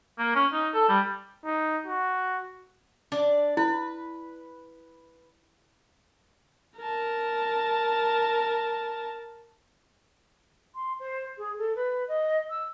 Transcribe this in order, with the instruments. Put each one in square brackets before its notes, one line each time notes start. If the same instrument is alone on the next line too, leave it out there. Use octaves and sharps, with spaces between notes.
[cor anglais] A#3
C#4
D#4
A4
G3
[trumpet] D#4
F#4
[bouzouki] D4 D5
[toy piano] E4 [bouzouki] B4
[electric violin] A#4 A5
[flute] C6
C5
G#4
A4
B4
D#5
E6